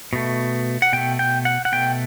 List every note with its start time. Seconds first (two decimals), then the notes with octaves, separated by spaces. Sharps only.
0.13 B2 A3
0.82 F#5
0.93 B2 A3 G5
1.19 G5
1.45 F#5
1.65 F#5
1.72 B2 A3 G5